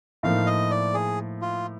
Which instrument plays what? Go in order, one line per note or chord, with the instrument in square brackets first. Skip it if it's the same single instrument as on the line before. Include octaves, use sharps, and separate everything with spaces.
[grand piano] A2 F3 A#3 D#4 [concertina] F5
[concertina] D#5
D5
G#4
F4